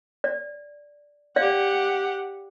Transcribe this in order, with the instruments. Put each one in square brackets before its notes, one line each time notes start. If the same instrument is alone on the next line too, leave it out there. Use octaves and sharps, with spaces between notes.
[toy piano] D5
[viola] G4 F#5 [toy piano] D5 F5